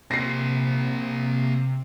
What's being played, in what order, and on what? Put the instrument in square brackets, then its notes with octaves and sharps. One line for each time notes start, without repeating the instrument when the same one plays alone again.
[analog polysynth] C3 [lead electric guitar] A#3 C5 [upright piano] A#6 C7